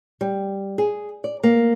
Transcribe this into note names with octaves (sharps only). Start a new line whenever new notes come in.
G3
G#4
D5
A#3